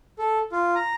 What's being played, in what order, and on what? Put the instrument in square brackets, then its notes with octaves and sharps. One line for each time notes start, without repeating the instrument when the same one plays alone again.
[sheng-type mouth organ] A4
F4
A#5